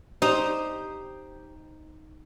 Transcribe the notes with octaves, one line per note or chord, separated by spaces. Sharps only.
D#4 G4 C5